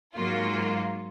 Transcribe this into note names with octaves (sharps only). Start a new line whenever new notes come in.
G#2 F#3 A#3 F4